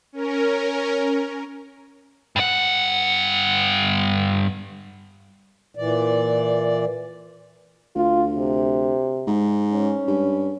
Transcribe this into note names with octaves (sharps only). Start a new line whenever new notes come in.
C#4 A#4
G2 F#5
A#2 E3 D5
D2 F4
C3
G#2
C#4
G2